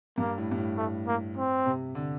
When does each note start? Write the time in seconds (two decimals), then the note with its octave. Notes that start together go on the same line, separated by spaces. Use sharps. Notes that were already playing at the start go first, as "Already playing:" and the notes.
0.18 G2 A#3
0.38 A2
0.52 G2
0.58 A2
0.77 A3
1.07 A#3
1.37 C4
1.66 C3
1.95 D3